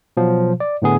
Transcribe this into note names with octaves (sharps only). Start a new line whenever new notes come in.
B2 F3 F#3
D5
A2 D3 B3 G#4